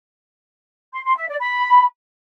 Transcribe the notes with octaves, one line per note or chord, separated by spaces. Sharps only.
C6
C6
E5
D5
B5